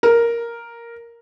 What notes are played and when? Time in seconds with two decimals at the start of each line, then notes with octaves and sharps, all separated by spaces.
0.03 A#4